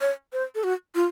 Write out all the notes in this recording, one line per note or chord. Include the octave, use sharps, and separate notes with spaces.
C#5
C5
A4
F#4
F4